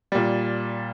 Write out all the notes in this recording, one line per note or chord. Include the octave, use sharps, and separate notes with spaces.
A#2 G3